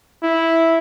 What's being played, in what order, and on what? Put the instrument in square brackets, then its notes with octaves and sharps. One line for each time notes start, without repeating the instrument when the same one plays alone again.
[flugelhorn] E4